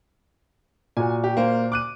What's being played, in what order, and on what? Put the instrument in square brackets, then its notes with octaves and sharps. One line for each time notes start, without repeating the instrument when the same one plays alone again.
[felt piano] A#2 F#4 [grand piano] G#5
[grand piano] G4
A#3 C5
D6 F#6 D#7